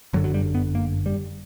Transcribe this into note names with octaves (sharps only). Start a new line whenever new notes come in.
G1 F#2 D3 F#3
F#3
G3
B3
A#3
G3